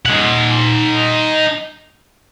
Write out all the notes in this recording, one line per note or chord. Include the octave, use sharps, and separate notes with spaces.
D#4 F#5